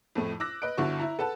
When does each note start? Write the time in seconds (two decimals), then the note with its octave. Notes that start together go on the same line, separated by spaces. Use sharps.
0.15 F2 A2 A3
0.40 D6 E6 F#6 A#6
0.62 B4 D#5 F#6 D7
0.78 G1 D3 E4 F#4 C#6
1.00 E4 A#5
1.19 A4 B4 F#5 A5